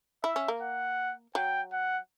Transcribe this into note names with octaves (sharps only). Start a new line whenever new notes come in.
E4 E5
C#4
A#3
F#5
F#3 G5
F#5